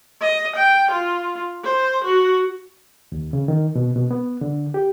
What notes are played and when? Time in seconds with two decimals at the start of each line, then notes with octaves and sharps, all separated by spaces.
0.21 D#5
0.56 G5
0.91 F4
1.64 C5
2.04 F#4
3.12 D#2
3.33 C#3
3.48 D#3
3.76 B2
3.96 B2
4.11 B3
4.41 D3
4.74 G4